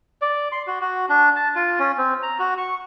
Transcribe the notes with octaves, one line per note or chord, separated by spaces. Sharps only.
D5
C6
F#4
F#4
D4
A5
F4
C#4
C4
A#5
F#4
C#6